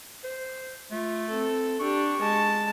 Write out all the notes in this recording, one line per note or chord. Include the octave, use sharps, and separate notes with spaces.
C5
A3 F4
C4 A4
D4 G4 C#6
G#3 A5